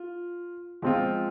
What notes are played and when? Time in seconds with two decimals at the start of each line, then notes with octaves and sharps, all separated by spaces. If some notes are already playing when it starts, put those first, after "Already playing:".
Already playing: F4
0.82 F3 G#3 C4 F4